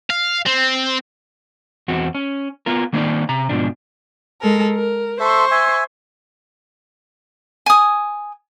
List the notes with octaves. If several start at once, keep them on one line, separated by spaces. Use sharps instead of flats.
F5
C4
E2 C4 F#4
C#4
B3 F4 A#4
D#3 A#3 C4 D4 D#4 D5
C3 A#5
G#2 B2 F3 D4
G#3 A4 A#4
A#4
A4 C5 E5 C6 C#6
E5 G#5
G#5 D#6